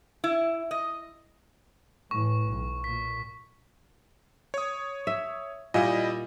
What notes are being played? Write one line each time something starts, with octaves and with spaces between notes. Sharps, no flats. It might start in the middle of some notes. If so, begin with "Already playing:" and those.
E4
D#5
A2 E3 C#6
B1
A#2 B6
C#5 D#6
E5
A#2 G3 E4 D#5